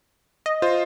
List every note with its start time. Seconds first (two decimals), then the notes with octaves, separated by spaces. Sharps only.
0.46 D#5
0.62 F4 C5